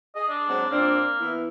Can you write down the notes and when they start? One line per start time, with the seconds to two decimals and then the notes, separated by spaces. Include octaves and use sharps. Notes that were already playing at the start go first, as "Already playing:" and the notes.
0.15 G#4 D#5
0.29 D4
0.48 F#3 G#3 C4
0.71 A#2 A#3 C4 D4
1.20 E3 B3 E4